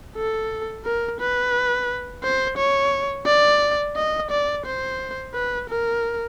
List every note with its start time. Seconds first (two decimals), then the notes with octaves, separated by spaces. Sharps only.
0.17 A4
0.85 A#4
1.20 B4
2.24 C5
2.57 C#5
3.27 D5
3.96 D#5
4.31 D5
4.66 C5
5.34 B4
5.70 A#4